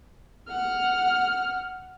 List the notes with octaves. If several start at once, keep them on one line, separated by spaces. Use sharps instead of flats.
F#5 F6